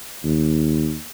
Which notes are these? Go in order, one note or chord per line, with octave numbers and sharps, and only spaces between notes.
D#2